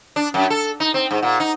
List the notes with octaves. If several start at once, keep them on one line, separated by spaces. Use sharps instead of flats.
D4
F#2
A4
D#4
C4
G#2
A#2
D#4